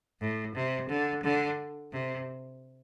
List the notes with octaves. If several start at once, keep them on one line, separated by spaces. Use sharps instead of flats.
A2
C3
D3
D3
C3